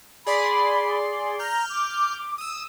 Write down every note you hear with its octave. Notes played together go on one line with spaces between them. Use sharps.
G#4 D5 B5 C6
A#5 F6 G6
D6
D#6 E6